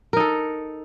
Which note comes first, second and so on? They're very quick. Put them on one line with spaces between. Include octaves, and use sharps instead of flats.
A#4 D#4 A4